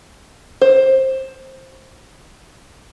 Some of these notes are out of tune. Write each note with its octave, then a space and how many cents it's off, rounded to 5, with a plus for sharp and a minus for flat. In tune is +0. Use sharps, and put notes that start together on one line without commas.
C5 +15